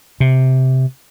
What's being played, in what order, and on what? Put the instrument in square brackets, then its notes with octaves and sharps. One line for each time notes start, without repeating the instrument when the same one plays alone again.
[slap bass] C3